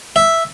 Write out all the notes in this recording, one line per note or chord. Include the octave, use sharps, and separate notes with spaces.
E5